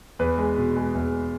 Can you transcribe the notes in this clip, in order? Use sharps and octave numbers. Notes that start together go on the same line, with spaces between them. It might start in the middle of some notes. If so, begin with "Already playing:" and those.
E2 B4
G#3
B2
G#3
E2